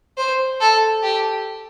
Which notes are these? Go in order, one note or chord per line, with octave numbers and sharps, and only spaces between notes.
C5
A4
G4